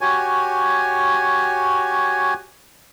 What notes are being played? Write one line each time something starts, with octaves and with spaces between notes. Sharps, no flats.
F#4 G4 C#5 G#5